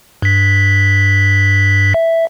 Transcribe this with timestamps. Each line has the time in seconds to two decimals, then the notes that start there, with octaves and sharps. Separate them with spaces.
0.22 G2 B6
1.94 E5